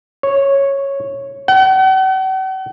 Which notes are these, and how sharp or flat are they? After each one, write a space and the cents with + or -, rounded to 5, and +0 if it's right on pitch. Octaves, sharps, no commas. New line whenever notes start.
C#5 -5
F#5 +45